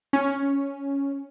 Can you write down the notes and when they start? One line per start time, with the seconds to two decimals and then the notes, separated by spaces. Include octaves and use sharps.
0.13 C#4